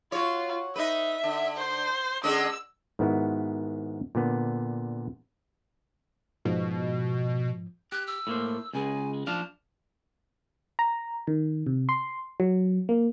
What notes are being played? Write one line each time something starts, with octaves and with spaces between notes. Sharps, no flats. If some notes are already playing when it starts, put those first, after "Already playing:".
F4 F#4 C#5
D#4 B4 E5
D3
C5
D3 G#3 C#4 E6
G#2 D#3 B3 E4 F#4
A#2 D3 B3
G#2 B2 F3
G4 F#6
E6
A2 A#3 C5
C#2 C#3 G#3 G#5
F3 D4 F5 A5
A#5
D#3
C3
C6
F#3
A#3